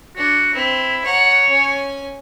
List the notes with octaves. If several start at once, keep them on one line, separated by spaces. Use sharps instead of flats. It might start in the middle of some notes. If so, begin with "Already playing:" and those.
D4 F#4
C4 E4
C#5 F#5 A#5
C#4 G#5